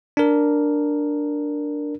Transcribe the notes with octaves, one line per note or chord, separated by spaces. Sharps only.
D4 A#4